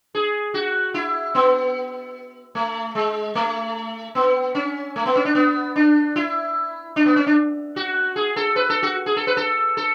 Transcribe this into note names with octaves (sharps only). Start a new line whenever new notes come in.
G#4
F#4
E4
B3
A3
G#3
A3
B3
C#4
A3
B3
C#4
D4
B3
D4
E4
D4
B3
C#4
D4
F#4
G#4
A4
B4
A4
F#4
G#4
A4
B4
A4
A4